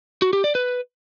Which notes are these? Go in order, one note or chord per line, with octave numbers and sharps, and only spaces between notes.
F#4
G4
D5
B4